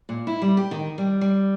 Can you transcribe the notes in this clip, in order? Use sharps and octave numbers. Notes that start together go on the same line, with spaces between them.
A#2
E4
G3
G4
D#3
G3
G3